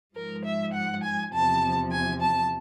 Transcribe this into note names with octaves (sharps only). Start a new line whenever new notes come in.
G#2 F3 G#3 A#4
E5
F#5
G#5
E2 C3 F3 A5
G#5
A5